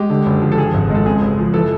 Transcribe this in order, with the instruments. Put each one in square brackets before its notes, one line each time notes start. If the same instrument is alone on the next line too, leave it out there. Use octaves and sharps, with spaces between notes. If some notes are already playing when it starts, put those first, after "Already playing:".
Already playing: [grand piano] G#3 G4
D3
F#1
F3
A4
F3 G#4
G#1
G#3 A4
C#3 G#4
F#1
F3
E3 A4